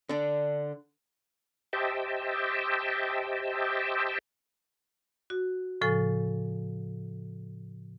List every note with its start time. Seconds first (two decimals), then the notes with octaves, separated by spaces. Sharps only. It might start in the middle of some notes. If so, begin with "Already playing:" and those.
0.09 D3 D4
1.73 G4 C5 D#5 E5 G5 A5
5.30 F#4
5.81 A2 C#3 F3 A4 G#5